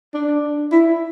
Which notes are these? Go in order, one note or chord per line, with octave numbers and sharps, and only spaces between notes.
D4
E4